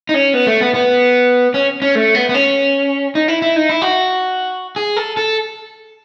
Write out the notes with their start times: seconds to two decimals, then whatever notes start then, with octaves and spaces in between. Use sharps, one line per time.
0.09 D#4
0.14 C#4
0.34 B3
0.47 A3
0.61 B3
0.74 B3
1.54 C#4
1.82 C#4
1.95 A3
2.15 B3
2.29 B3
2.34 C#4
3.15 D#4
3.28 E4
3.42 E4
3.56 D#4
3.69 E4
3.82 F#4
4.76 G#4
4.97 A4
5.17 A4